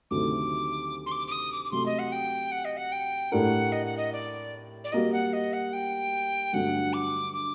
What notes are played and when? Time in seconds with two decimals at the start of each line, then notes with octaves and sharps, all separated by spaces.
0.10 D2 C3 D#3 F#3 A3 D6
1.06 C6
1.11 D6
1.27 D6
1.31 D#6
1.52 D6
1.64 D6
1.71 C3 F#3 A3 C6
1.85 D#5
1.98 F#5
2.12 G5
2.51 F#5
2.64 D#5
2.77 F#5
2.92 G5
3.32 A2 A3 D4 G4 A#4 F#5
3.72 D#5
3.85 F#5
3.97 D#5
4.12 D5
4.84 D5
4.92 G3 A#3 F#4 D#5
5.12 F#5
5.33 D#5
5.53 F#5
5.73 G5
6.53 G2 D3 F#3 A3 F#5
6.93 D6
7.33 D6